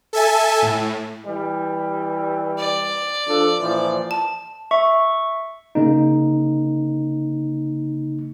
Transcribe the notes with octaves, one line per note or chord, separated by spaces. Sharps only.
A4 E5 G#5 A5
A2
E3 G3
D5
F3 D4 A4
A#2 E3 F3
A5
E5 C#6
C#3 A#3 D#4